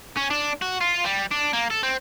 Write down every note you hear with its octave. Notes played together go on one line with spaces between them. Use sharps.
C#4
D4
F#4
F4
G3
D4
A#3
A4
C4